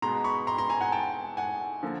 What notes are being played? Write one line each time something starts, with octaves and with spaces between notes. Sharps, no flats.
B2 G#3 B3 A#5 C6
B5 C#6
A#5 C6
A#5 C6
G#5 A#5
F#5 G#5
G5 A5
F#5 G#5
D3 F3 A#3